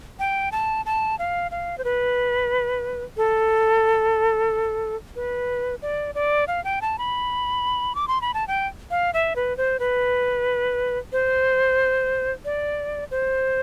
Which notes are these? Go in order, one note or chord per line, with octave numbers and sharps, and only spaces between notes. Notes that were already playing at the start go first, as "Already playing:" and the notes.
G5
A5
A5
F5
F5
C5
B4
A4
B4
D5
D5
F5
G5
A5
B5
D6
C6
B5
A5
G5
F5
E5
B4
C5
B4
C5
D5
C5